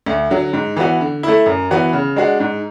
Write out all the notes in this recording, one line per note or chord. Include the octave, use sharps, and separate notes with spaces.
D2
D3 F#3
G#2
E3 B3 F#4
D3
A3 E4
F#2
E3 B3 F#4
C#3
G#3 D4 F#4
G#2